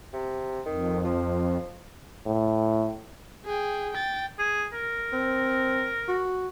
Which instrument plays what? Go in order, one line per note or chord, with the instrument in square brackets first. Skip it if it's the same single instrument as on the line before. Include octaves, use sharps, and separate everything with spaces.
[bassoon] C3
[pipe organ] F2 [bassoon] D#3
[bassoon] F3
[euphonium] A2
[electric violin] G#4 G5
G5 A6
[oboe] G#4
A#4
[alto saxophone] C4
F#4